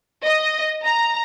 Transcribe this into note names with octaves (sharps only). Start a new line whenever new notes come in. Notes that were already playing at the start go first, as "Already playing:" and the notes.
D#5
A#5